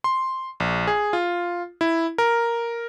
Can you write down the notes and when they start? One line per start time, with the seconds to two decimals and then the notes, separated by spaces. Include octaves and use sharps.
0.04 C6
0.60 A#1
0.87 G#4
1.13 F4
1.81 E4
2.18 A#4